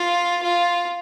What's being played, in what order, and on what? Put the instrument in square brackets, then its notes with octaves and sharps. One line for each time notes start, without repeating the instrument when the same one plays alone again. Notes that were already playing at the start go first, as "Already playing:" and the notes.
Already playing: [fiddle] F4
F4